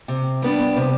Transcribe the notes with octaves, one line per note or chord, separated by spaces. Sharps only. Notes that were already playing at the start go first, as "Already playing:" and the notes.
C3
G3 B3 D4
C3